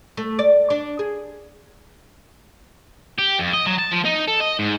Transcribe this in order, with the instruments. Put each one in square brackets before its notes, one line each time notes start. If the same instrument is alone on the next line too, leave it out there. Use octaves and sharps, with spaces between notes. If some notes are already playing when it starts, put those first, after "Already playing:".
[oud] A3
D5
D4
G#4
[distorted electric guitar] G4
F2
D#5
F#3
A5
F3
D#4
A4
D#5
G#2